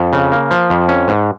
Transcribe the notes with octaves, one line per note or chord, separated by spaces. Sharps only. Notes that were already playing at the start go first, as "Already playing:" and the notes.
Already playing: F2
C#3
A#3
F3
F2
C#4
G#2